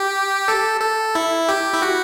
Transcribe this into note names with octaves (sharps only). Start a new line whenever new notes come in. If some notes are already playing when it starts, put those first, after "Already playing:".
Already playing: G4
A4
A4
E4
G4
E4
F#4